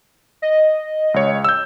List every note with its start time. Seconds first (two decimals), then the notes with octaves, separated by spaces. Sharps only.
0.42 D#5
1.14 C#2 C#5
1.44 E6 G6